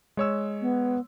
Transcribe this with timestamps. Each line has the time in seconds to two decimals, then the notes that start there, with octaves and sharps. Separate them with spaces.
0.17 G#3 C#5 E6
0.61 B3